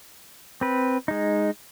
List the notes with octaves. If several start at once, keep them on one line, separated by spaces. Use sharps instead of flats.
C4 B4
G#3 D#4